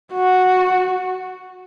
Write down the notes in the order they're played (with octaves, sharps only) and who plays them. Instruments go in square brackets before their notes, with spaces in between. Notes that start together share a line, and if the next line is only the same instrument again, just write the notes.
[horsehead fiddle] F#4